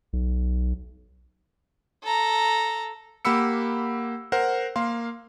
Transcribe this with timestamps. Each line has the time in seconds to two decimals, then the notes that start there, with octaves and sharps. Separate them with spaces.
0.13 B1
2.04 A4 A#5
3.25 A#3 G4 F#5 B5 E6 C#7
4.32 A#4 C5 F#5
4.76 A#3 F5 C6